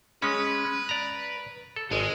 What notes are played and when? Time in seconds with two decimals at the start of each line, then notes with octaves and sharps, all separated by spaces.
0.22 G#3 C#4 B4
0.89 D5 A#5
1.76 A4
1.91 G#1 G#3